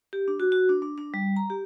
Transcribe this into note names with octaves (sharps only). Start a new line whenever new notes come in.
G4
D4
F#4
F#4
D4
D4
D4
G3
A#5
G4